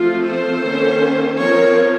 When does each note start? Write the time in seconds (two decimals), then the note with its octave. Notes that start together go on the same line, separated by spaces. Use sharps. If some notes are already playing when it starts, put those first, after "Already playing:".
Already playing: F3 A3 C4 F4
0.27 A4 C5
0.65 D#3 A#3 C#4
1.40 F3 C4 A#4 C#5